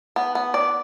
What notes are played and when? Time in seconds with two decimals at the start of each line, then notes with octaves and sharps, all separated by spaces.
0.16 B3
0.35 B3
0.54 D5